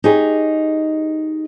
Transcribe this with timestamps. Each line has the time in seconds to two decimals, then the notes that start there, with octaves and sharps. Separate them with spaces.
0.04 D#4 G4 G#4 C#5